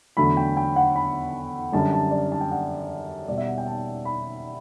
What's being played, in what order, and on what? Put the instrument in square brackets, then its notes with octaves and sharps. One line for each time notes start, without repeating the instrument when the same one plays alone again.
[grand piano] E2 D3 F#3 A3 B5
G5
G5
F#5
B5
F#2 D3 G3 A5
A5
D5
A5
G5
F#5
B2 G3 D5
E5
F#5
G5
A5
B5